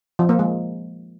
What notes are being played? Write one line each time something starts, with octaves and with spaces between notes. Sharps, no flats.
F3
A#3
G#3